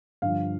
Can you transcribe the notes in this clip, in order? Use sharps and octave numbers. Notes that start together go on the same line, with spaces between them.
G2 D3 F3 F5